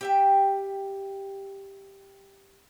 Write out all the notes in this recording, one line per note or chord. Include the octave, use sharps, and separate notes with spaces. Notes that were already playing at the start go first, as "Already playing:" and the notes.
G4 E5 G5